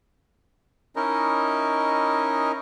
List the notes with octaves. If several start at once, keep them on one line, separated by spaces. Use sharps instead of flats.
C#4 D#4 E4 A#4 D#5